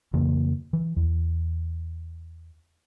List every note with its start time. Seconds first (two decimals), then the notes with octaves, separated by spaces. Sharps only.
0.13 F2 C#3 E3 A#3
0.73 E3
0.96 E2